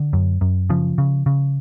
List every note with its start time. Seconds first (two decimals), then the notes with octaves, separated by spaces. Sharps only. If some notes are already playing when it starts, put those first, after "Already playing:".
Already playing: D3
0.13 F#2
0.41 F#2
0.70 C#3 F3
0.98 C#3
1.26 C#3